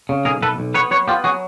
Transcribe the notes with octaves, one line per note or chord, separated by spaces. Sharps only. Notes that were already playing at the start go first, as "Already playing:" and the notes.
C#3
B1 G#4 A#4
B1 A4 B4
B1
B3 B4 C#5
F#3 B4 C#5
B3 F4 G4
F#3 F#4 G#4